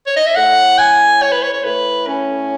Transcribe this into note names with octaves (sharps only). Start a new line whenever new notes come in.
C#5
D#5
E5
A2 F#5
G#5
C#5
B4
C#5
C#5
A2 B4
C#4